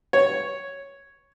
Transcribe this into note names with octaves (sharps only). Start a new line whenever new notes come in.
C#5